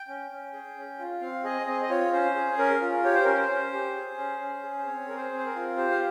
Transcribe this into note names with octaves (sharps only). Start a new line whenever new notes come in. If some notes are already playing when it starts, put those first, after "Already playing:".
Already playing: G5
C#4
C#4
G#4
C#4
F4
C4 F5
G#4 D#5
C4 D#5
D#5
F4 C#5
C#4 C5
G#4
C#4 A#4
F4
G4 C#5
C5
C#4 A#4
C5
C#4
G4
G#4
C#4
C#4
G#4
C5
C4 C#5
G#4 A#4
C5
C4
C5
A#4
F4
G4 C5
F5